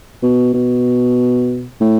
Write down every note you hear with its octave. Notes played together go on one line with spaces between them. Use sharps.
B2
B2
A2